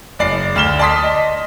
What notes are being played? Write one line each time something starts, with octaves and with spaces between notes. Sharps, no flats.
F#1 D5 C7
D2 F6 E7 G7
D5 A5 C6 D#6 B6
D#5